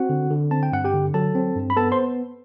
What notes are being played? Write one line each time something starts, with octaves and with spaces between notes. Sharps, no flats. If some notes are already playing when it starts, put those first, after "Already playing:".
Already playing: C4 F#4 F#5
D3
D3
C4 A5
G5
G2 F#5
G4 G5
D3
F#3 A4 A5
C4
G2
B5
B3 A4 A5
C5 C6